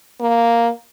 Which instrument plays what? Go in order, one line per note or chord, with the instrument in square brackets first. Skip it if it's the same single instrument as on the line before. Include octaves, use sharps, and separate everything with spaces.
[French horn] A#3